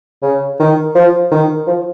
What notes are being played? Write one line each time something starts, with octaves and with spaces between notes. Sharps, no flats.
C#3
D#3
F3
D#3
F3